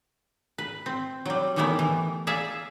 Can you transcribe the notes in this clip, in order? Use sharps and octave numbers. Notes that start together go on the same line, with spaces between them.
B4
C4
F#3 G3
D#3 E3 G3 A3 B3 E4
E3
G#4 D5 E5 F5 G#5